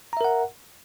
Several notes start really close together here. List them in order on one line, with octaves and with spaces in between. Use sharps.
A#5 E5 A#4 F#5